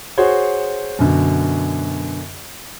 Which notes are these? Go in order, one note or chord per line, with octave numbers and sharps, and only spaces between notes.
F#4 G#4 C5 C#5
F#2 B2 D3